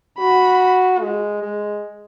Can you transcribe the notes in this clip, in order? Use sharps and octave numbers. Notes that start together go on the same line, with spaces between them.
F#4 B5
G#3
G#3